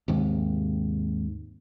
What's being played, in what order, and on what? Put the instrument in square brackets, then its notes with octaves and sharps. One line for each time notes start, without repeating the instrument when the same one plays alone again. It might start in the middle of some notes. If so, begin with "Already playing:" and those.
[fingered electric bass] D#2 G#2 C3